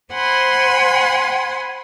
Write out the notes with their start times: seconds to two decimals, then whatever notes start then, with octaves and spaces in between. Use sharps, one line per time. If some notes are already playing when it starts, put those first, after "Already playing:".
0.13 C5 F#5 G#5 B5 C6